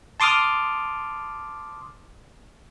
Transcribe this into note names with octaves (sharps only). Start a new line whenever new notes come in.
A5 C6 D6 D#6 F6